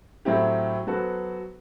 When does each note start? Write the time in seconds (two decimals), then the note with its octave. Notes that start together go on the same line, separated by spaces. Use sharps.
0.25 A2 F#3 C4 E4 G4
0.87 F#3 B3 F#4 A4 C5